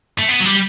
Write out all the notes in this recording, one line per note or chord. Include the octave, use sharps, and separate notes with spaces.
A3
B3
F#3
G3